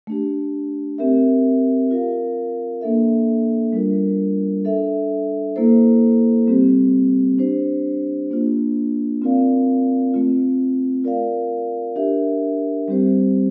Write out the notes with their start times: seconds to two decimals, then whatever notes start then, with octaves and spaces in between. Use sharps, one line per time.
0.07 A3 D4 G4
0.98 C4 G4 A#4 E5
1.91 F4 A#4 F5
2.81 A#3 D4 A4 E5
3.73 G3 D4 F4 A#4
4.65 D4 A4 E5
5.56 A#3 E4 A4 C5
6.47 G3 C4 G4
7.38 D4 G4 C5
8.31 A#3 D4 F4
9.22 C4 F4 A#4 D5 F5
10.14 A3 C4 F4
11.04 F4 A#4 D5 F5
11.96 D4 G4 A#4 E5
12.88 G3 C4 G4 C5